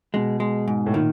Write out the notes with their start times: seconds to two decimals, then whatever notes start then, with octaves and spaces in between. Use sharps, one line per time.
0.14 B2 G#3
0.40 G#3
0.68 G#2
0.86 A2
0.93 A#2 D#3